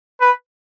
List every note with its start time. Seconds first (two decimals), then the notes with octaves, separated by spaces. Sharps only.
0.21 B4